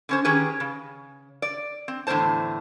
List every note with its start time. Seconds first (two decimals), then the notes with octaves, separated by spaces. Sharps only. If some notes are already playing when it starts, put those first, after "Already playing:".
0.09 D3 C#4 C5
0.24 D#3 C#4 G4 G#4 B4
0.60 C#3
1.42 D5
1.88 C4
2.07 E2 A2 D3 C#4 C5 A5